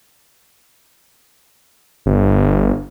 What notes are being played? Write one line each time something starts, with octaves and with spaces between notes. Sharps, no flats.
G1